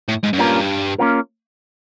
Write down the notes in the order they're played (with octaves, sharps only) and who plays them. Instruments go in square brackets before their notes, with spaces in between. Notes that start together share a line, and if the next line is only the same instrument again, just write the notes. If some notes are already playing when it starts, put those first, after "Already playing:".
[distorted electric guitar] A2
G#2
F#2
[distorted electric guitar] G2 [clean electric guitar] A#3 C#4 F4 A#4
[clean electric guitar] A#3 C#4 F4 A#4